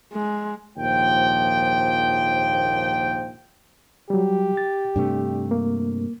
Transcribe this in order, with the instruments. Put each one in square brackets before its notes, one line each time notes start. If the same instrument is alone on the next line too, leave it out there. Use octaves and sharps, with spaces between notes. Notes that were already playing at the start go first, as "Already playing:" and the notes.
[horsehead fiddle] G#3
[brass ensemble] A#1 D#2 G#2 F3 G5
[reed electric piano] F#3 G3 [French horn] G4
[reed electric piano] A6
[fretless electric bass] G2 C3 A3 [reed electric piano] D4
[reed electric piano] A#3